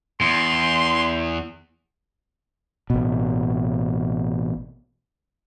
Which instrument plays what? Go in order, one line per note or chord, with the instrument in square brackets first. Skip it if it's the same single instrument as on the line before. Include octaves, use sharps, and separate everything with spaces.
[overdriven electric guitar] E2 [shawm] C6
[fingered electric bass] A1 B2